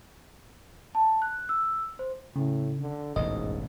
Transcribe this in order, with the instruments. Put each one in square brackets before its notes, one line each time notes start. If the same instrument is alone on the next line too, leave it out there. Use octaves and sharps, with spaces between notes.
[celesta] A5
F#6
E6
C5
[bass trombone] A2 [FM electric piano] C#3
[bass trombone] D3
[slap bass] E1 A1 F2 [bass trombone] G#2 [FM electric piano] D#5